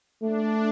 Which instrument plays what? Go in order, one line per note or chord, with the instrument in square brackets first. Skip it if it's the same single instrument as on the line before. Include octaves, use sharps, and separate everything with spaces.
[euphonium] A3 [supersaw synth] D4